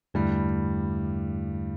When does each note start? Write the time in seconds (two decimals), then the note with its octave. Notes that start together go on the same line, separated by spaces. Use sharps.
0.14 E2 G2 D3 G3 A3 E4